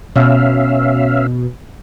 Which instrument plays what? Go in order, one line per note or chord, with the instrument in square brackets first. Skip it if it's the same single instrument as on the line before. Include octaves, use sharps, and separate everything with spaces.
[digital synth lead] B2 [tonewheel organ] C#4 E5 F5